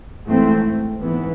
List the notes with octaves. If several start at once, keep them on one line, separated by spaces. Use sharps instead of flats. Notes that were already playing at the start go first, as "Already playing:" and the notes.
G#2 E3 A3 C4
G#1 G#2 E3 B3